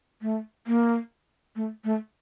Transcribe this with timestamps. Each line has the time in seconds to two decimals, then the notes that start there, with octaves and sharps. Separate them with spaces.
0.22 A3
0.67 A#3
1.56 A3
1.84 A3